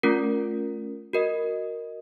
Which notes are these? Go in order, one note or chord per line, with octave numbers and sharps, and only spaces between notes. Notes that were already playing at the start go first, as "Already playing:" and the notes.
A3 C#4 F4 A#4
F#4 A#4 D#5